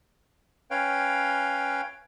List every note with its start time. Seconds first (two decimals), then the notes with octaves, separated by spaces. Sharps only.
0.71 C#4 B4 C#5 F5 G5